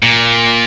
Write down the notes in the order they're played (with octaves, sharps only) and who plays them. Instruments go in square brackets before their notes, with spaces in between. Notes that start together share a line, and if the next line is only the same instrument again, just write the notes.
[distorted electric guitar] A#2